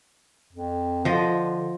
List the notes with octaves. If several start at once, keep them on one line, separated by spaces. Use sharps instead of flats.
F2
D3 F3 D#5